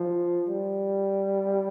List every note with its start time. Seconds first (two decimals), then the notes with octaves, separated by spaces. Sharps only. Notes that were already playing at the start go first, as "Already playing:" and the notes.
Already playing: F3
0.48 G3